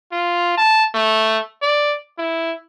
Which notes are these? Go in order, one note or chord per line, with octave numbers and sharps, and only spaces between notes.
F4
A5
A3
D5
E4